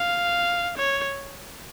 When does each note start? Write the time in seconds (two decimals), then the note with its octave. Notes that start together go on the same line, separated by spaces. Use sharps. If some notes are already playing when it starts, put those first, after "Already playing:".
Already playing: F5
0.77 C#5